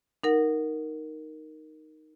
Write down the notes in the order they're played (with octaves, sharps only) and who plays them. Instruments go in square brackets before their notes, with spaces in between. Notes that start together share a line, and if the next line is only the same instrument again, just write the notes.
[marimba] D#4 A#4 F#5